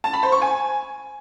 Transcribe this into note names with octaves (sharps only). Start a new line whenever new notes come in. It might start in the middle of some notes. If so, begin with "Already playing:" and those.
A5
B5
C5
C#6
G#5